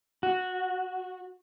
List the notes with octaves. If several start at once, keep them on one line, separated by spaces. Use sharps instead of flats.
F#4